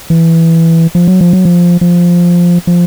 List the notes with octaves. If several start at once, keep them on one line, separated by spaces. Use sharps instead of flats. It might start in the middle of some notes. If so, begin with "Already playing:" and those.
E3
F3
F#3
F3
F#3
F3
F3
F3